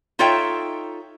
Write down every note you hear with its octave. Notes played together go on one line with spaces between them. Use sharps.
D#4 F4 A4 C#5 E5 G5